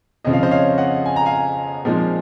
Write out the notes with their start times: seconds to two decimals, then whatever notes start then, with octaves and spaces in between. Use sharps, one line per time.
0.25 F2 C#3 F3 D#5
0.33 F5
0.43 C5 D#5
0.51 C#5 F5
0.78 D#5 F#5
1.06 G#5
1.16 A#5
1.26 F5 G#5
1.85 A#2 F3 G#3 C4 D#4